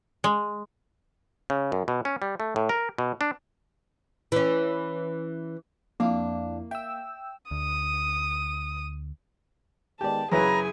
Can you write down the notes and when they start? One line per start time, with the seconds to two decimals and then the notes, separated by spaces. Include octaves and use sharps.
0.24 G#3
1.50 C#3
1.72 F#2
1.88 B2
2.05 C#4
2.22 G3
2.40 A3
2.56 A2
2.69 A#4
2.98 B2
3.21 D4
4.32 E3 C#4
6.00 F2 A#3 D4 E4 F5
6.71 E5 G5 E6
7.51 D2 D#6
10.01 D#3 G#3 B3 G4 D5 A5
10.32 F#2 C#3 E4 G#4 B4 G#5 A#5